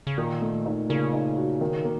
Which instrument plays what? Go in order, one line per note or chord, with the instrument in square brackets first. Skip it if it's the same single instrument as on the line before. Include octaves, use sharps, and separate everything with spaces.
[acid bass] C#3
[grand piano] A#2 [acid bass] D#3
[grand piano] A3
D#4
[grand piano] A#2 [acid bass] C#3
[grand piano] D#4
F#4
D#3
A#3